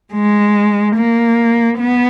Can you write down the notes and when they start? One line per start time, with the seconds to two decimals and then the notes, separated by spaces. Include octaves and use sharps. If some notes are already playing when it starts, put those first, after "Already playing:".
0.13 G#3
0.96 A#3
1.79 B3